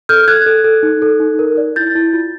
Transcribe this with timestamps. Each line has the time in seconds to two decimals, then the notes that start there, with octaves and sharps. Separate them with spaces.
0.09 A4 F6 G6
0.27 A4 F#6 G#6
0.46 A4
0.64 A4
0.83 D#4
1.02 A4
1.20 D#4
1.39 A#4
1.57 D5
1.76 E4 G6 A6
1.95 E4
2.13 F4